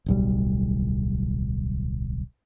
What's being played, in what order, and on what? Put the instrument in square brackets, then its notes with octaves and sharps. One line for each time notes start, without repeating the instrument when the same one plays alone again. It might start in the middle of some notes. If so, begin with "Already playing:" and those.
[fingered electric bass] D1 B1 G3